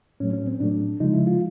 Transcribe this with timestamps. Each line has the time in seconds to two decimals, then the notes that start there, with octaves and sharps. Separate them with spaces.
0.20 A2 F#3 A3 C#4
0.33 C#4
0.47 C4
0.60 A2 F#3 A3 D4
1.00 C#3 F3 G#3 D#4
1.13 E4
1.27 F4